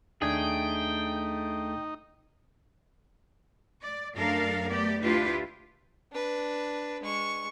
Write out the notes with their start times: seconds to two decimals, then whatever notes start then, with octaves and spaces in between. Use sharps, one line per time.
0.22 D#2 A3 D4 D#4 G#4 G5 G#6
3.83 D5
4.15 F#2 A3 D4 A4 A#4 F5
4.67 A3 B3 G4 D5
5.03 D2 D4 E4 F4 G4 B4
6.12 D4 B4
7.03 G#3 C#6